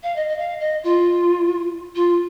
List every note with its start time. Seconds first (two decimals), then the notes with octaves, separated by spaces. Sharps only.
0.03 F5
0.15 D#5
0.28 D#5
0.38 F5
0.60 D#5
0.83 F4
1.95 F4